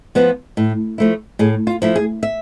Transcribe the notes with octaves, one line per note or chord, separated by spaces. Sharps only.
F3 B3 F4
A2
F3 A3 E4
A2 G#4
F4
F3 A3 E4
G#4
E5